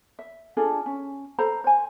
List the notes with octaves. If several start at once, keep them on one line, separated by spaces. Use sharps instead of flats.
E5
D4 F4 G#4 A4
C#4
A4 C5 A#5
C5 G#5